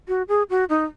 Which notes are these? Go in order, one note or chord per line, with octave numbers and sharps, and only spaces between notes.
F#4
G#4
F#4
D#4